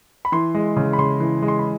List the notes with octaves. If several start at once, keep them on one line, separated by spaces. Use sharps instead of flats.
B5
E3 C6
G#3
C#3
B5
C#3 C6
E3
G#3
C6
B5